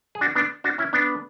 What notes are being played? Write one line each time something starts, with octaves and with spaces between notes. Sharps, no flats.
G#4
D4 F#4
B3 D4
D4 F#4
C#4 E4
B3 D4